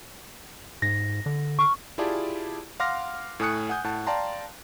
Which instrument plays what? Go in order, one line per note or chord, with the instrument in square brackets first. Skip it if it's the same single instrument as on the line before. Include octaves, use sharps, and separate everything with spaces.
[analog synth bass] G#2 [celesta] A#6
[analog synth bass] D3
[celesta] C#6 F6
[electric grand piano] E4 F4 G4 G#4 D5 A5
F5 F#5 C6 D6 F6 A#6
A2 A3 G#5 D#6 F#6 C#7
F#5 G#5 D#6 G6
A2 F#5 A5
D5 F5 G5 A5 A#5 C6